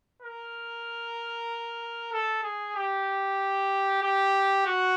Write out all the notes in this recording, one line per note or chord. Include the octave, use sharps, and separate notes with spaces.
A#4
A4
G#4
G4
G4
F#4